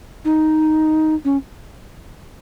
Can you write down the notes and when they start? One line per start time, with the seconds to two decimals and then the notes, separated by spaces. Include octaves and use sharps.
0.25 D#4
1.25 C#4